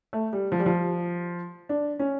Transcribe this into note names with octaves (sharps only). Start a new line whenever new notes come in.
A3
G3
F3
G3
F3
D4
C#4